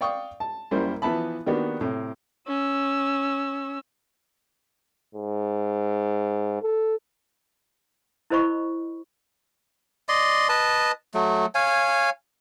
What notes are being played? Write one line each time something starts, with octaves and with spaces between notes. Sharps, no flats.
D5 F5 G5 C#6 D#6
A5
F#2 G3 A#3 E4 C5
E3 F3 B3 E5 A5 B5
D#3 A#3 B3 D4 F#4 G4
A2 C3
C#4 E6
G#2
A4
E4 A#4 C5 D#5 B5 C#6
D5 D#5 C6
B4 D#5 A5
F#3 A3
C#5 F5 G#5